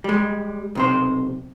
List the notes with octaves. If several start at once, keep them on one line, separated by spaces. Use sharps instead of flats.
G3 G#3
B1 C3 C5